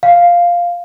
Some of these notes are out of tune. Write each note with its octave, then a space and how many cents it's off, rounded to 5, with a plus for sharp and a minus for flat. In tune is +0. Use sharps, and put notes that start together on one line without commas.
F5 +0